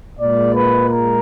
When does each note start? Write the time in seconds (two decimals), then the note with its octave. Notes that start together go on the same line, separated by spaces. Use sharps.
0.20 A#2 G#3 D5
0.55 B4
0.89 A#4